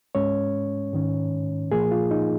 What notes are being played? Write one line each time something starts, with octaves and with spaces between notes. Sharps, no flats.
G#2 G#3 C#4 C#5
G#2 D#3 C#4
A#2 F3 A#3 G#4
F4
D#4